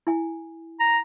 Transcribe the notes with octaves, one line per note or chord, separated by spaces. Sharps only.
E4 G#5
A#5